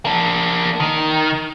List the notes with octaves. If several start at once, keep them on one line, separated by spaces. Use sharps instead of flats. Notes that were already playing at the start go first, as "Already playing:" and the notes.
A#3 D4
D#3